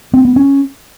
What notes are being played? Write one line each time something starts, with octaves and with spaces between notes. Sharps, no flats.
C4
B3
C#4